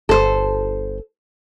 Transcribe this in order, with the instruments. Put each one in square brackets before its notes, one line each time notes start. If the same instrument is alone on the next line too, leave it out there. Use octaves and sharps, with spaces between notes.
[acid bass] G1 [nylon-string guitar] A4 C5